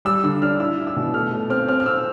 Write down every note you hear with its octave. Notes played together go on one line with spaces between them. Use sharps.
G3 E6
D3 E6
D4 F6
E4 E6
E4
E6
B2
A3 F6
A3
C4 F6
C4 F6
F6
C4 E6